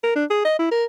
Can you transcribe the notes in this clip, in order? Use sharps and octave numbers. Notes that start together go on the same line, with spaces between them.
A#4
D4
G#4
D#5
E4
A#4